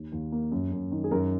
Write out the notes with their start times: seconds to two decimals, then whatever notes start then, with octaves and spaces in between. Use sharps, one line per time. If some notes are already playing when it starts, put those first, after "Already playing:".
Already playing: D#2
0.12 D#2
0.32 A#3
0.52 F#2
0.72 F#2
0.91 D#3
1.04 G#4
1.11 F#2 A#4